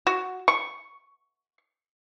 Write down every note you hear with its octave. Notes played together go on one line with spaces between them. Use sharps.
F#4
C#6